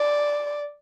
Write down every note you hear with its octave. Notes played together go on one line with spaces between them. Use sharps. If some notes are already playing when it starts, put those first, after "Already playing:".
Already playing: D5